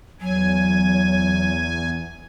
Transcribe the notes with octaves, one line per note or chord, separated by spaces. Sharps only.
E2 F#3 G#5